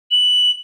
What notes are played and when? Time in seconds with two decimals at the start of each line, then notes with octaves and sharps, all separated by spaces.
0.11 F#7